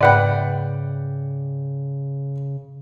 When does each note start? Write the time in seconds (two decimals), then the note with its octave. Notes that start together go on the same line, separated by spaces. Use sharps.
0.01 G#2 C#3 B4 D5 F#5 G5 B5